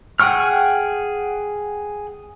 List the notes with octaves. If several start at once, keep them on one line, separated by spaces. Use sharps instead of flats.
G#4 F#5 G5 C#6 F6